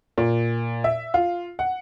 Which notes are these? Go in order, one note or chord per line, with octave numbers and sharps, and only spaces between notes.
A#2
E5
F4
F#5